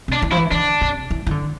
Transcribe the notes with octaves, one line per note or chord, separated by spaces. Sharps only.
C3 D4
E3
F3 E4
E3
D3 D4
C3
E3
E3
D3